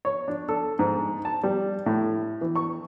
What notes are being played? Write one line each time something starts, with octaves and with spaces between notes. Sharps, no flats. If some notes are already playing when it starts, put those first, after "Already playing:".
C#5
D4
A4
G#2
A5
G3
A2
E3
C#6